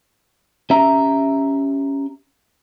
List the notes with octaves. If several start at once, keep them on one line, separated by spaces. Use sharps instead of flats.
C#4 G4 E5 A#5